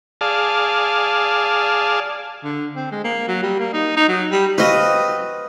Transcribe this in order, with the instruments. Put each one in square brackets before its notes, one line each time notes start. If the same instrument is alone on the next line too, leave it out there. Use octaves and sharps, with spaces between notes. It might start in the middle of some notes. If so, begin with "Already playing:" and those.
[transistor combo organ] G#4 D5 F5 A5
[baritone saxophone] D3
C4
G#3
A#3
F#3
G3
A#3
D#4
D#4
F#3
G3
[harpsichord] C4 F#4 F5 [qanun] B4 D#5